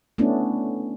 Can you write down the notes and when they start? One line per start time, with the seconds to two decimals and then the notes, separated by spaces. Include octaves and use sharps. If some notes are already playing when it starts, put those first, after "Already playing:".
0.18 A3 B3 C#4 D4 E4